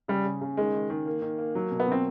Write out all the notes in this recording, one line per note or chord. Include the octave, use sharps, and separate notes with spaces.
C#3 G3
C#3
C#3
D#3 G#3
D#3
D#3
A#3
D#3
A#3
F#3
B2
B3
B2 C4